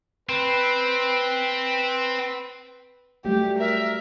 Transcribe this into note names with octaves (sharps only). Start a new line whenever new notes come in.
C4 B4
F#3 G3 A3 G4
A#4 E5